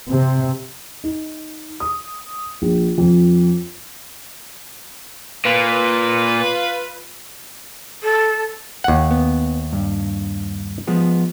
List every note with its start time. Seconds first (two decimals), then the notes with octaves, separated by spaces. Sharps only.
0.10 C3
1.04 D#4
1.80 D#6
2.62 A#1
2.98 F2
5.45 A#2 F4 B4
8.03 A4
8.84 D#2 F#5
9.11 B3
9.73 G2
10.87 F3 G#3 B3